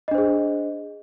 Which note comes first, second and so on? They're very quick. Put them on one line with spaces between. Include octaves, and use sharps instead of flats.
D#5 D4 C5 G#4